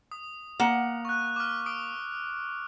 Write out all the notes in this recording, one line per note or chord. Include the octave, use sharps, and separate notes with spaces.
D#6
A#3 F#5
C#6 F#6
D6 F6
D#6 D7